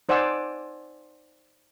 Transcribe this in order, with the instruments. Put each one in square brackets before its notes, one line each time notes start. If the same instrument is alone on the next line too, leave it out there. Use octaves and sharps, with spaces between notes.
[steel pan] D#4 C5 D5 F#5 G#5 E6